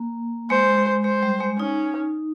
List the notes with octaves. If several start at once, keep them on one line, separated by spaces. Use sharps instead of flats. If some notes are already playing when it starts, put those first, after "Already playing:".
Already playing: A#3
G#3 C5
G#3
G#3 C5
G3
G#3
C#4 D#4